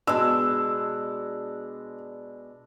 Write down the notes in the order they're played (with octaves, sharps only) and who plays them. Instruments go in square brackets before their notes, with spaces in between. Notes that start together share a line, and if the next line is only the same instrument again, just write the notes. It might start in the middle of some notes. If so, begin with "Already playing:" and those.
[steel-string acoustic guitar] B2 G#3 [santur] D4 [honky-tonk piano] E6